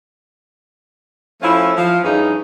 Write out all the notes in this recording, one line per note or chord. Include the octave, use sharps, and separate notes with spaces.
F3 A3 C#4 E4 F4
F3
G2 E3 C#4 D#4 G#4